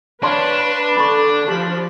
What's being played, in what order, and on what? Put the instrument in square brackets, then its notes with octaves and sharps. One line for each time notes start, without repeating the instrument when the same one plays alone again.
[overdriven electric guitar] D4 [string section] B4 [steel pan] C#5 D5 F5 [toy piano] A5 C6
[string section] D3 [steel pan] A5 D6 [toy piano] B5 C#6
[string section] F3 [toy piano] G4 [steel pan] A5 B5